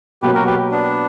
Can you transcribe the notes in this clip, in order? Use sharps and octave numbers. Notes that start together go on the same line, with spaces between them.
B2 F#3 A#3 C#4 G4 B4
F#4 A#4
G4 B4
B3 D4